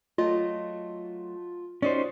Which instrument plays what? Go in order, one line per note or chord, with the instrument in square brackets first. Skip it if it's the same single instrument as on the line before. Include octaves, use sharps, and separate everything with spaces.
[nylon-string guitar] F#3 A3 D#5 [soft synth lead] F4
[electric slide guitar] C#4 D#4 C5 [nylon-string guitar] F4 F#4 D5